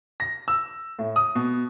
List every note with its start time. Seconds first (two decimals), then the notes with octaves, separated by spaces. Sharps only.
0.20 A#6
0.48 E6
0.99 A2
1.16 D#6
1.35 B2